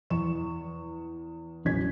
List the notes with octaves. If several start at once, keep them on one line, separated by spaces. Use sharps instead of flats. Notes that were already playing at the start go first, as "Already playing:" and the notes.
E2 C#6 E7
E1 A1 F#3 C#4 G#6 B6